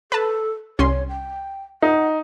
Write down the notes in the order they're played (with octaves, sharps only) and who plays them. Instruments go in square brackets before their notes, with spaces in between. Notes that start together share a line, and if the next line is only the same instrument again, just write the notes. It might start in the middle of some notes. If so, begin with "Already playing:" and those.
[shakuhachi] A4 [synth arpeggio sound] B4 A5
[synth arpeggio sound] C2 C#4 C6 [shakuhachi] C#5
[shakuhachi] G5
[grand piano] D#4 [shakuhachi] F#5